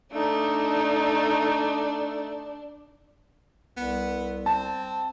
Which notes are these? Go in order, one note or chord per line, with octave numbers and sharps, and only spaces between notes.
A3 D4 D#4
C2 B3
C4 A5